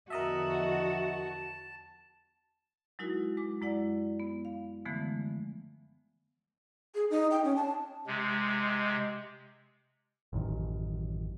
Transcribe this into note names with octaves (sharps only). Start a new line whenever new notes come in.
E2 D3 F3 F#4 A#4 D#5 E5 A5
F#3 G#3 D#4 E4 F#4 A#4
G#3 D6
F#2 G#3 E4 D5 F#5
B3
F5
D3 E3 F3 G#3 A3 B3
G#4
D#4
G5
C#4
A5
C3 G#3
A1 F#2 D#3